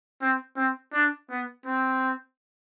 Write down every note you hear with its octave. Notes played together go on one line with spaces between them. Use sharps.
C4
C4
D4
B3
C4